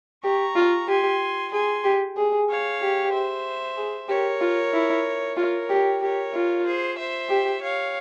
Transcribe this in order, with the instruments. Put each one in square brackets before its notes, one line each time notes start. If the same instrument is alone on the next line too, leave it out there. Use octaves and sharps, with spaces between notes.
[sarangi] G4 [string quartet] A#5 C#6
[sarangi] F4
[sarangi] G4 [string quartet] G#5 C6
[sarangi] G#4 [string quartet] G#5 C6
[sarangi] G4
G#4
[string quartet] C#5 F5
[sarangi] G4
[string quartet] C5 E5
[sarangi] G#4
[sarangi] G4 [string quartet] A#4 C#5
[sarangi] F4
E4
[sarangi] F4 [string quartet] A#4 C#5
[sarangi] G4
[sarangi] G4 [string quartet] A#4 C#5
[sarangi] F4
[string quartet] G#4 C5
C5 E5
[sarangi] G4
[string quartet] C#5 F5